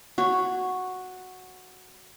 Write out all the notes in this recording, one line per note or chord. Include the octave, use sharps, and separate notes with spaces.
F#4 C#5